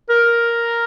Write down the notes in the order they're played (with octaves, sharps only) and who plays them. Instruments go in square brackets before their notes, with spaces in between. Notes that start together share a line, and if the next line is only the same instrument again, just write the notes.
[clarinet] A#4